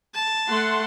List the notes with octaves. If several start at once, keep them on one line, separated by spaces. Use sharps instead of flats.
A5
A3 F#5 C6